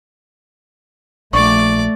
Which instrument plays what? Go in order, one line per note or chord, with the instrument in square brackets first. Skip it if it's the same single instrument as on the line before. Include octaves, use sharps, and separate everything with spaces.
[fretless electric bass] A#1 [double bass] A3 [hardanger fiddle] D5 D6 [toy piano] C#6